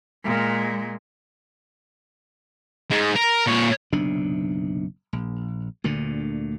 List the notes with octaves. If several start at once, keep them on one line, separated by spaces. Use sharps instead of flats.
A#2 G#3
G#2 G#3
A#4
A#2 C#5
F#1 B1 C3 D4
A#1
D2 A#2 D3